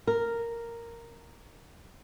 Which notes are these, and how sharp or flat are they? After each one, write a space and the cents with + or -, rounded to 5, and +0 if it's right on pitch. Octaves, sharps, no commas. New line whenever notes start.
A#4 -5